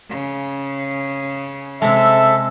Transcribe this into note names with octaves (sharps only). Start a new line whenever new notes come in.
C#3
C3 G#3 A4 E5